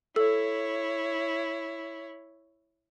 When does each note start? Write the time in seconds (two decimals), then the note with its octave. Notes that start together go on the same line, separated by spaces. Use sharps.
0.16 E4 A4 C#5